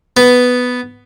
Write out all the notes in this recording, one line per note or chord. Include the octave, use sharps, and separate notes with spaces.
B3